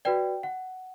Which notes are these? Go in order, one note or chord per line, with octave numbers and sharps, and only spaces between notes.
F#4 B4 D5 G5
F#5